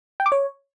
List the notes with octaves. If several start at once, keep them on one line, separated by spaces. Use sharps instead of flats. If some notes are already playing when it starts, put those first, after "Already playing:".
G5
D6
C#5